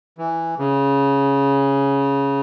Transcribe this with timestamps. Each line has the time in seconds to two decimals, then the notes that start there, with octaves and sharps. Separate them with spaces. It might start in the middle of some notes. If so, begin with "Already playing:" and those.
0.18 E3
0.59 C#3